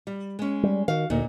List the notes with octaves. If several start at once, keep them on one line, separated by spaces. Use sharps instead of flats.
G3
G#3 C#4
G3
D#3 F#4 F5
D2 A#2 A#3 D#4